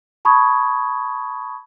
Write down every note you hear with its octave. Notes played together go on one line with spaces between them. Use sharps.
A5 B5 C#6 D#6 G#6